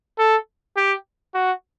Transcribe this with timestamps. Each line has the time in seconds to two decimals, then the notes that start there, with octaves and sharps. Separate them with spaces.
0.19 A4
0.77 G4
1.34 F#4